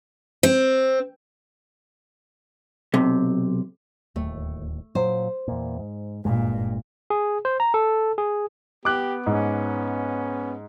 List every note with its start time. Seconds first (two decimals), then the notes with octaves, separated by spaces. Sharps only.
0.43 C4
2.94 B1 C3
4.16 D1 D#2 A3
4.95 A#2 F#3 C5
5.48 E2 A#2
5.79 G#2
6.25 F#1 G2 A#2 G#3
7.10 G#4
7.45 C5
7.60 A#5
7.74 A4
8.18 G#4
8.85 B3 G4 D6 F#6
9.26 G#2 C#4